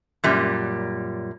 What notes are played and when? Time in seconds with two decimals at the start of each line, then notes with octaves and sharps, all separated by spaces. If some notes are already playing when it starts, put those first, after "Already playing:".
0.24 F#2 A#2 G3